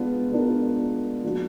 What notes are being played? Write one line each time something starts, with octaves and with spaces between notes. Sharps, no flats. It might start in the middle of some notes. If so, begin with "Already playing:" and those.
Already playing: G#3 B3 D4 F4
G#3 B3 D4 F4 A#4
F3 A#3 D4 F#4